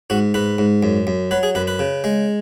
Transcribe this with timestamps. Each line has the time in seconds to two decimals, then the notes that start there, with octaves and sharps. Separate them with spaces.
0.10 G#2 F#4
0.34 G#2 B4
0.58 G#2
0.83 F#2
1.07 F#2
1.31 F#3 B4
1.43 G#4
1.55 F#2 B4
1.67 B4
1.79 C#3
2.04 G#3